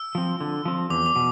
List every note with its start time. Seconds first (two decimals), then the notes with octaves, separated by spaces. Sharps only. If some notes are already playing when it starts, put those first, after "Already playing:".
Already playing: E6
0.15 F3 C4
0.40 D3
0.65 F3 C4
0.90 E2 D6
1.06 D6
1.16 B2